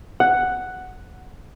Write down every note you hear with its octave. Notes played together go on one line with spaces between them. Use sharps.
F#5